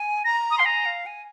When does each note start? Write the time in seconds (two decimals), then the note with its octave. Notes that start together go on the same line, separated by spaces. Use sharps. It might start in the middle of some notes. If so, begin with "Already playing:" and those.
Already playing: G#5
0.25 A#5 A#6
0.51 D#6
0.58 F5 C6
0.65 G#5 A#5
0.86 F5
1.06 G#5